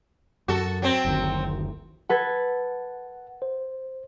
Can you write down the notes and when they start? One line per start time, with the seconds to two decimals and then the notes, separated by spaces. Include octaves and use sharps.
0.48 F#2 F#4 A4
0.82 F#3 C4
1.04 F#1 D2 D#3
2.10 A4 B4 F#5 G#6
3.42 C5